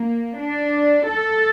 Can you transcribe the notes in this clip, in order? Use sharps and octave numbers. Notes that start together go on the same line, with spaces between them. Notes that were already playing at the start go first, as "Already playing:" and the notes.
Already playing: A#3
D4
A4